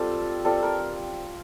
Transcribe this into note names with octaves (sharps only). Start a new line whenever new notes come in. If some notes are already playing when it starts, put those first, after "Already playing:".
Already playing: G3 C4 F4 A4
G3 C4 F4 A4
A#4